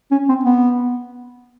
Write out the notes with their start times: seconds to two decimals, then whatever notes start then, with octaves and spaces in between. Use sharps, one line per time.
0.12 C#4
0.29 C4
0.45 B3